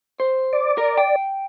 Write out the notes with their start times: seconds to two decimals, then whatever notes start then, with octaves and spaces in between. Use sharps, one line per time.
0.20 C5
0.53 D5
0.78 A#4
0.98 G5